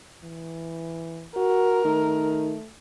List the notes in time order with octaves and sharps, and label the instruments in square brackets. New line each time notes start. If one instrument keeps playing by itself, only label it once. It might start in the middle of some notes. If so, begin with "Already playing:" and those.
[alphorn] E3
[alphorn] F#4 [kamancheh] A#4
[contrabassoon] D#3 [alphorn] A3